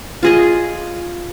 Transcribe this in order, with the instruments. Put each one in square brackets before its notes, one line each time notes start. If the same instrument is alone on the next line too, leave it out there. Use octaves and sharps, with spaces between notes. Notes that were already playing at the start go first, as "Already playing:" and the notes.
[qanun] F4 G#4 D#5